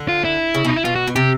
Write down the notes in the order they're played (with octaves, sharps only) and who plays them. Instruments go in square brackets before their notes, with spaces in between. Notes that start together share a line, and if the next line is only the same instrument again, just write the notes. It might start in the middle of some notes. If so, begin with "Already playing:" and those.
Already playing: [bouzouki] D3
[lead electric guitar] F4
E4
[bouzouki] C#3
[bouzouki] B2 [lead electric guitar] D#4
[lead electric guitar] E4
[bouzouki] B2 [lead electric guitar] F4
[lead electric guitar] F#4
[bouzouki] B2
[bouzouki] C3 [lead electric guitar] G4